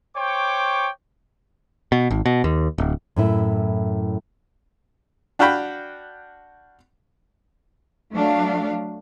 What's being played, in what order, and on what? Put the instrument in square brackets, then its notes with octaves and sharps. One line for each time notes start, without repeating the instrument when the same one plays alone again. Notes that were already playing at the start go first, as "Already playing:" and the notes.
[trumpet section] C5 C#5 G5 C#6 D6
[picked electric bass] B2
G#1
B2
D#2
D1
[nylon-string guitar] F#2 A2 E4
[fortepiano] D4 F#4 F5 G5 B5
[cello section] F#3 A3 D4 F5